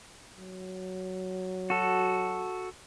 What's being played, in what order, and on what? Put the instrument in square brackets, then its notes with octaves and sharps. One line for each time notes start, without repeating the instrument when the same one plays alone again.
[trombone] F#3
[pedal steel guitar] F#4 A4